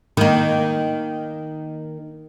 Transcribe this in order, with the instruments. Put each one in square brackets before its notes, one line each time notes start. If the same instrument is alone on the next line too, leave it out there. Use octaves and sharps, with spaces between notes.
[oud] D#3 A#3